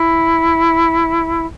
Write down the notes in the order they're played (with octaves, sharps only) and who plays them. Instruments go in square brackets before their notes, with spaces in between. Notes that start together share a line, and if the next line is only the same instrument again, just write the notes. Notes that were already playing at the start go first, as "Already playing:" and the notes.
Already playing: [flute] E4